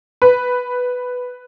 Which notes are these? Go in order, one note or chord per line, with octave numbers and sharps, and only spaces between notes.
B4